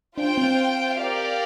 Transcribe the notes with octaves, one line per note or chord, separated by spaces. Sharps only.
D4 F4 C5 G5
C4
G4 A#4 D5 F5